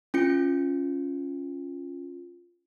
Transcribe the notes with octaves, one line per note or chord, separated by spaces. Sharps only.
C#4 F4 C#7